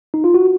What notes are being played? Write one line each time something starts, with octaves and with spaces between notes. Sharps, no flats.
D#4
F4
F#4